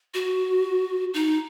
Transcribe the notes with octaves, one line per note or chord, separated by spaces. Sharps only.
F#4
D#4